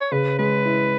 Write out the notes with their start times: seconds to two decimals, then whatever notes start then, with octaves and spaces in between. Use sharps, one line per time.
0.01 C#5
0.12 C#3 B4
0.39 G#3 B4
0.65 E4